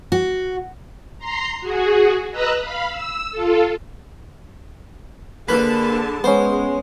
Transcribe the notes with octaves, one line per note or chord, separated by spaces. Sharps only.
F#4
A#5 C6 C7
F#4 G#4
B4 D#5 A#5 E6 F#6
F5 B5
E6
F4 A4
D3 A#3 G#4 B4 A5 B5
G#3 B3 C#4 C5